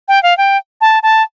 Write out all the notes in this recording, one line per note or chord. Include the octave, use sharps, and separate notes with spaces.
G5
F5
G5
A5
A5